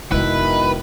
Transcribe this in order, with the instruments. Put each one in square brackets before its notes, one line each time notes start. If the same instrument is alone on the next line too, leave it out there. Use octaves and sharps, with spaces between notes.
[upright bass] F1 G#3 [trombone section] B2 D#3 [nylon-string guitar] E4 [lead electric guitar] B4